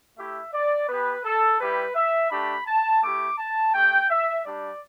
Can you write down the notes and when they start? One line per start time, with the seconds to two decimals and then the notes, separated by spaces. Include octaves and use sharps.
0.18 A3 E4 G4 E5
0.54 D5
0.89 B3 G4 B4
1.25 A4
1.61 G3 E4 G4 B4
1.96 E5
2.31 A3 D4 G4 B5
2.67 A5
3.03 A3 E4 G4 D6
3.38 A5
3.74 A3 G4 G5
4.10 E5
4.45 G3 D4 G4 D5